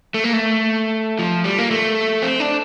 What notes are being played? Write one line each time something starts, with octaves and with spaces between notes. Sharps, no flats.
A3
A#3
A3
F3
G3
A#3
A3
C4
D4